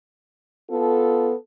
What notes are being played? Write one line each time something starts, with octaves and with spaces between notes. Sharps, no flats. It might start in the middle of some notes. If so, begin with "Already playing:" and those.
B3 F4 A4